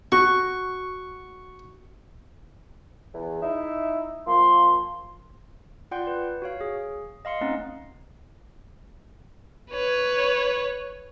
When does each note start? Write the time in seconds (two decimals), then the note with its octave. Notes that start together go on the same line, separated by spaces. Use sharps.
0.12 F#4 C#6
3.13 E2
3.41 D#4 E4 E5
4.26 F3 A#3 C6
5.91 F4 D5 F#5 G5 C6 G6
6.07 B4
6.42 F#4 C#5 F5
6.61 G#4
7.25 D#5 F5 C6 C#7
7.41 A3 C4 C#4 D#4 D#5 F#5
9.71 B4 C#5